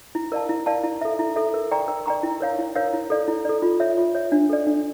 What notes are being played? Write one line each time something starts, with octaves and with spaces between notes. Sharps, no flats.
E4
A#4 D5 F5 A5
E4
A#4 D5 F5 A5
E4
A4 E5
E4
A4 E5
A#4
D5 G5 A#5 C#6
A#4
D5 G5 A#5 C#6
E4
A#4 C#5 F5
E4
A#4 C#5 F5
E4
A4 D5
E4
A4 D5
F4
C#5 E5
F4
C#5 E5
D4
A4 D5
D4